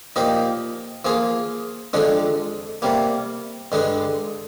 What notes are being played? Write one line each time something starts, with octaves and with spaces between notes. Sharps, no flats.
A#2 F3 A#3 D#4 G4
F3 A#3 F4 G#4
F2 D3 F3 G#3 D4
C3 G3 A#3
G2 D3 G#3 D4